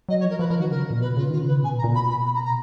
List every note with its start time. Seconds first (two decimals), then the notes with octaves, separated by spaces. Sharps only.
0.09 F#3 D#5
0.20 C#5
0.24 F3
0.30 A#4
0.39 F3 B4
0.49 F3 A#4
0.60 D#3 F#4
0.70 C#3 A#4
0.91 A#2
1.01 B2 B4
1.17 C#3 F4
1.30 D#3 F4
1.41 C#3
1.47 B4
1.63 B2 G#5
1.74 A#2
1.78 A#5
1.84 A#2
1.94 B2 B5
2.10 B5
2.25 B5
2.35 A#5
2.45 A#5